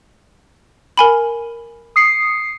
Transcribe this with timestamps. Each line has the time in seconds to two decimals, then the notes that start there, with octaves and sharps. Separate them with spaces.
0.97 A#4 G#5 B5
1.96 D#6 C7 C#7